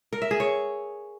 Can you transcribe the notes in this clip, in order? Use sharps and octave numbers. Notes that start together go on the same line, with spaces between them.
A#4
E5
G#4
C#5